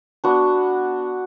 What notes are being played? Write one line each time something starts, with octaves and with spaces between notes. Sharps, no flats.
B3 D4 F#4